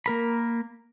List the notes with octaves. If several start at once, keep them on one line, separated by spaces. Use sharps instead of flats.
A#3 A#4 B5